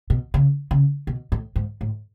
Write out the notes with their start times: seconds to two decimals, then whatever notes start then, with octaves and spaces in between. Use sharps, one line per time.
0.10 B2
0.34 C#3
0.71 C#3
1.07 B2
1.32 A2
1.56 G#2
1.81 A2